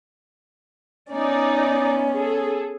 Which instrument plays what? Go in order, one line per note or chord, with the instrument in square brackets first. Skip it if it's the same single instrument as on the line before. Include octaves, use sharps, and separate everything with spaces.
[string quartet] B3 C#4 [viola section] D#4 D5
[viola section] G#4 A4